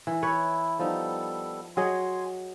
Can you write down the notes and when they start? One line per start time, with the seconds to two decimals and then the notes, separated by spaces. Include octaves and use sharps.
0.07 E3
0.23 E4 B4 C#5
0.79 F3 G3 B3 D#4 A4
1.77 F#3 G#4 D#5 G#5 C6